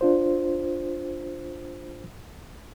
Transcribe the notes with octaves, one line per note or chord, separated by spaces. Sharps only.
D4 F4 C5